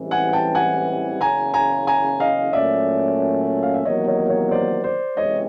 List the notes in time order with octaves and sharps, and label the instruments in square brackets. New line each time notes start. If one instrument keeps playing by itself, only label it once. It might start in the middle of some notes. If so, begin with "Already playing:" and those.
Already playing: [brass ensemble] A1 G#2 E3 G3 C4
[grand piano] F#5 G#5
G5 A5
F#5 G#5
[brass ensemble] F#1 E2 C#3 [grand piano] G#5 A#5
[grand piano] G#5 A#5
G#5 A#5
D#5 F5
[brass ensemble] A#2 F#3 A3 C#4 [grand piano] D5 E5
[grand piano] F5
E5
[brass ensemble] E2 C3 D#3 F#3 A#3 [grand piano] C#5 D#5
[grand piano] C#5 D#5
C#5 D#5
C5 D5
C5 D5
[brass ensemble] F#1 E2 C3 E3 G#3 [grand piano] C#5 D#5